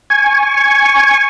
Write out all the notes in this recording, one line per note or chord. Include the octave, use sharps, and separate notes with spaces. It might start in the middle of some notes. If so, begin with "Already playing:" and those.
G#5 C#6